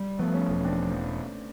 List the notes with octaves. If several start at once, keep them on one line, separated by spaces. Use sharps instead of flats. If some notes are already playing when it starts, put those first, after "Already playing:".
Already playing: G3
F3 A3 B3
B3 C#4
E1
C4 D4